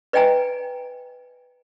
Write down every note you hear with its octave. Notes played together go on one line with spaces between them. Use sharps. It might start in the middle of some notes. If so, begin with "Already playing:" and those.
B4 D5 D#5 G5 G#5 A#5